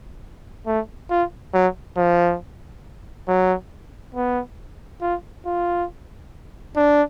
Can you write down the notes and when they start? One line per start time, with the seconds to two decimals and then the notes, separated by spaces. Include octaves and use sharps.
0.66 A3
1.10 F4
1.54 F#3
1.97 F3
3.28 F#3
4.15 B3
5.01 F4
5.46 F4
6.76 D4